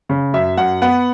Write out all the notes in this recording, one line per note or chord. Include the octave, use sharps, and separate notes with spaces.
C#3
F#2 E5
F#2 F#5
B3 F#5